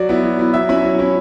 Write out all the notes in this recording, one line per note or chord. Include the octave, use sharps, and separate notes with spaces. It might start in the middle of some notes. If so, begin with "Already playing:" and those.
Already playing: F#3 D5
B3 E4
F#3
B3 E4
F#3 E5
C#4 E4 B5
F#3
C#4 E4